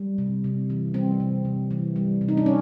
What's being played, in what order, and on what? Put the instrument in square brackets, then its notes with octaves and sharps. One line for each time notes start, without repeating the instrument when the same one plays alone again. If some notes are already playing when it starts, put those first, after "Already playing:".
Already playing: [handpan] G3
C3
C3
E3
G3 C4
C3
C3
E3
G3
C3
D#4
D4
C#4